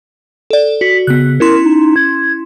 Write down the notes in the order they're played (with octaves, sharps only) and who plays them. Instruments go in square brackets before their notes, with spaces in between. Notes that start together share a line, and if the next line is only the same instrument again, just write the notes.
[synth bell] A4 D5
[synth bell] F#4 [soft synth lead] B6
[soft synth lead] C#3 [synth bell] B3 F#6
[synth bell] C#4 E4 C6 [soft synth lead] A#4
[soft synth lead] D#4
G#6